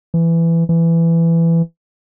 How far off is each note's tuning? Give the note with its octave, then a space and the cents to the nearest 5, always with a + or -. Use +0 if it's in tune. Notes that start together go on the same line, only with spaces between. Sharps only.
E3 +15
E3 +15